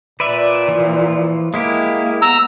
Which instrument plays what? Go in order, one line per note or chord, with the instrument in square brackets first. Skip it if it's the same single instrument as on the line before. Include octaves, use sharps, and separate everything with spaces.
[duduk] A#2 [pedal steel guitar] B4 D5 E5
[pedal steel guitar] E3 F3
[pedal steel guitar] G#3 E4 G4 [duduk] A#3
[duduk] B3 [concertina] A#5 E6